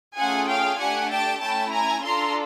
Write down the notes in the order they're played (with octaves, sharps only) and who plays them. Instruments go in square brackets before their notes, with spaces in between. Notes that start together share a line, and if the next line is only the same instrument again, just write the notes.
[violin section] A3 C#4 F4 G#4 F#5 G#5
F5 G5
A3 D4 G4 F#5 G#5
G5 A5
A3 C#4 E4 G5 A5
G#5 A#5
D4 F4 A4 A#5 C6